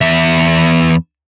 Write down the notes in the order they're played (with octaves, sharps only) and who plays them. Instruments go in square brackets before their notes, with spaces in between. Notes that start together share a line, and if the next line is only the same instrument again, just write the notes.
[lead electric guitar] E2 E5